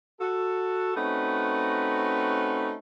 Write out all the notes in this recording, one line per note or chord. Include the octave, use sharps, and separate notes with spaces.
F#4 A4
A3 C4 C#4 D#4 F#4 B4